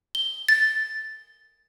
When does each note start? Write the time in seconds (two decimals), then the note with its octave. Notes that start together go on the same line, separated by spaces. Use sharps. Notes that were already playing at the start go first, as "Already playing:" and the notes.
0.15 G7
0.49 A6